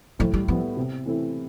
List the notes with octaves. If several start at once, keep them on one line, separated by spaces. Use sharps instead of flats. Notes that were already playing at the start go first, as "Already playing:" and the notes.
A2 F3
G3
F3 G3 B3 E4
C3
E3 A3 C4 E4